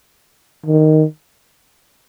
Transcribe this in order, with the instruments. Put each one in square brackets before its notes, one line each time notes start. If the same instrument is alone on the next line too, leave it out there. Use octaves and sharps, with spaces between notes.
[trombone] D#3